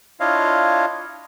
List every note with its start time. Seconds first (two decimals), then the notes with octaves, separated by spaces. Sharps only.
0.20 D4 E4 F4 C#5 D#5 F5